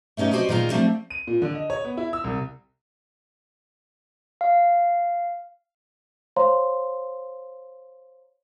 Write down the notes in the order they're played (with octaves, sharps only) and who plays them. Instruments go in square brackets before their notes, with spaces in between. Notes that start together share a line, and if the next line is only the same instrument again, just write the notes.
[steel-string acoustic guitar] A3 B3 C#4 D#4 G4
F#4 G4 A#4 C5 D5 D#5
A#2 D#3 G#3 F4 A#5
F3 G3 A3 C4 D4
[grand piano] D#7
A#2
D3
D#5
C#5
B3
E4
E6
C2
[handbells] F5
[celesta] C5 C#5 F5 A#5 C6